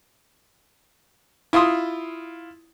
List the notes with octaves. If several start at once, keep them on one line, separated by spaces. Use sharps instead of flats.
E4 F4 C6 D#6